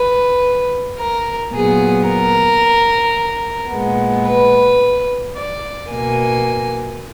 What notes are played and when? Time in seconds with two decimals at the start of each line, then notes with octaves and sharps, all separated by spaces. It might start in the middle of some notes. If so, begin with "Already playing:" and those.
Already playing: B4
0.98 A#4
1.52 A#2 F#3 B3 G#4
2.07 A#4
3.71 A#2 G#3 B3
4.26 B4
5.36 D5
5.91 B2 A#3 G#5